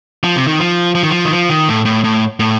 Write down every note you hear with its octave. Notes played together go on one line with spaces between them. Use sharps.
F3
C3
D#3
F3
F3
D#3
F3
D#3
F3
D#3
A2
A2
A2
A2